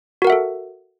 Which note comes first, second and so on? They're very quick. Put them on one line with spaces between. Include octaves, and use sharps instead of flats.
F#4 A#4 F#5 E5 A4